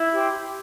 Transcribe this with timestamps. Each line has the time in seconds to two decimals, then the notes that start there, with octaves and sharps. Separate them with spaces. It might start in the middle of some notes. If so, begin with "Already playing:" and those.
Already playing: E4
0.14 G4 C5 G5